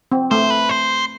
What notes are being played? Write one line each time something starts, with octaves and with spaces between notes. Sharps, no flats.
C4
A3 C5
B4
C5